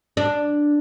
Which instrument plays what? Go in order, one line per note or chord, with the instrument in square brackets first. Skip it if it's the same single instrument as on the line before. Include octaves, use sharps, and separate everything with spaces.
[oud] D4